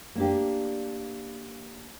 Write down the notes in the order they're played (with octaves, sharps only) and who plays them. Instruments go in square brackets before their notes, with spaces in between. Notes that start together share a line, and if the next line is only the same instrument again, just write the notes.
[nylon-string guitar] A#3 D4 G4